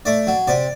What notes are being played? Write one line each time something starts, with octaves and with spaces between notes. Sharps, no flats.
A3 D5
F#3
C3 D5